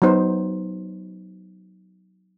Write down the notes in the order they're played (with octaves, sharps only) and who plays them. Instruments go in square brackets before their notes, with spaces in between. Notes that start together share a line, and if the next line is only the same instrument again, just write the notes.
[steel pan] F#3 B3 D#4 C5